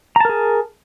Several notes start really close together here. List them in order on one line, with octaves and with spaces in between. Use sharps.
A#5 A5 A#4 G#4